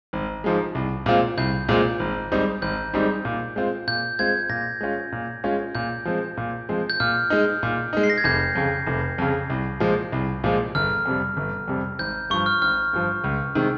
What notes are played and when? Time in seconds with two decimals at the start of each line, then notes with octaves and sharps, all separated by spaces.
0.13 G#1
0.44 G#2 F3 G#3
0.75 C2
1.06 A#2 G#3 C4 F4
1.38 C2 G6
1.69 A#2 G#3 C4 F4
1.99 G#1
2.32 G#2 G3 C4 D#4
2.62 G#1 G6
2.94 G#2 G3 C4 D#4
3.25 A#2
3.56 G#3 C4 F4
3.87 A#2 G6
4.19 G#3 C4 F4 G#6
4.49 A#2 A#6
4.81 G#3 C#4 F4
5.12 A#2
5.44 G#3 C#4 F4
5.75 A#2 G6
6.05 F3 G#3 C4
6.37 A#2
6.69 F3 G#3 C4
6.90 G6
7.00 A#2 F6
7.30 G#3 D#4
7.63 A#2
7.93 G#3 D#4
8.03 C7
8.10 A#6
8.18 G#6
8.24 F1 G6
8.55 F2 C#3
8.86 F1
9.18 F2 C#3
9.50 C2
9.80 A#2 F3 G#3
10.12 C2
10.44 A#2 F3 G#3
10.75 G1 F6
11.05 F2 C3 G3
11.37 G1
11.68 F2 C3 G3
11.99 G#1 G6
12.30 G2 C#6
12.34 F3
12.46 F6
12.62 G#1 F6
12.93 G2 F3
13.24 C#2
13.55 C3 D#3 G#3